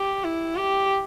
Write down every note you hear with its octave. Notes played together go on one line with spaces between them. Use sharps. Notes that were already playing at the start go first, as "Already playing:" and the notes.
Already playing: G4
E4
G4